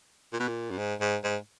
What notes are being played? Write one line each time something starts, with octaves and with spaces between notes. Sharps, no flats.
A#2
B2
A#2
F#2
G#2
G#2
G#2